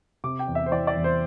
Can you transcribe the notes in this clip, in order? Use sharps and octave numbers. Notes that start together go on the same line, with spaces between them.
C3 D6
G5
E2
E5
C5
E3 D5
D5
E2
C5